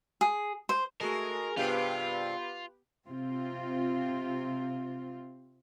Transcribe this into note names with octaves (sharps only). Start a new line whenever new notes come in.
G#4
C5
G#3 A3 F#4 A4 A#4
G2 C3 B3 F4 G4 B4 F5
C3 C4 F4